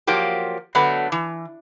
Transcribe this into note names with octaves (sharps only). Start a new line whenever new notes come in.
F3 F#3 A#3 G4
D3 F#3 A3 B3
E3